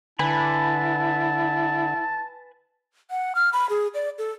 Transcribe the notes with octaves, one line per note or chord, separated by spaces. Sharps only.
D3 E4 B4 G#5 A5 B5
F#5
F6
B5
G#4
D5
A4